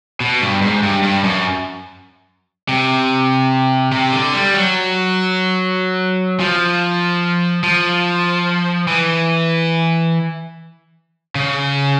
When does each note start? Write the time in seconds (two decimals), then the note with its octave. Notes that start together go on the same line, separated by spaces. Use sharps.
0.20 B2
0.41 G2
0.62 G#2
0.82 G2
1.03 G2
1.24 F#2
2.69 C3
3.92 C3
4.13 D3
4.34 G3
4.54 F#3
6.40 F3
7.63 F3
8.87 E3
11.35 C#3